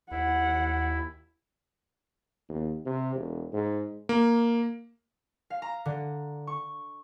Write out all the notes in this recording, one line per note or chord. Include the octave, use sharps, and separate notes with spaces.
D#2 E4 F#5
D#2
C3
E1
G#2
A#3
F5
A#5
D3
C#6